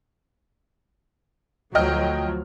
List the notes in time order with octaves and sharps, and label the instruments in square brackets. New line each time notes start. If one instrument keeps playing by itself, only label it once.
[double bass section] D2 [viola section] F3 F#3 [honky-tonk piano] D#5 G5 F6